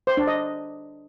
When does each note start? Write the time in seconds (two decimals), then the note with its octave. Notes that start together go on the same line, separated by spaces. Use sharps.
0.07 C5
0.17 D4
0.27 D#5